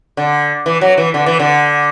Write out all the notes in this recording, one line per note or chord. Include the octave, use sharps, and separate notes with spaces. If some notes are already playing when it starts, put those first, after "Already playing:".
D3
E3
F#3
E3
D3
E3
D3